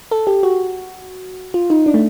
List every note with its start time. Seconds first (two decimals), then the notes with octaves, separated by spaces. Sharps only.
0.11 A4
0.27 G4
0.43 F#4
1.54 F4
1.70 D#4
1.86 D4
1.94 A3